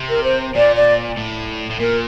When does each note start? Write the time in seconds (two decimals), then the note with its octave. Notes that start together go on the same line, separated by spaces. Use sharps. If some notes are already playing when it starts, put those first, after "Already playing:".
Already playing: C3
0.09 A#4
0.24 C5
0.55 A#2 D5
0.76 D5
1.17 A2
1.70 A2
1.79 A#2 A#4